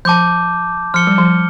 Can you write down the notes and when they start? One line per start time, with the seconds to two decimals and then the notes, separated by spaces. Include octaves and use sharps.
0.05 F3 A5 D6 G6
0.94 F3 F6 C#7 G7
1.07 G3
1.18 F3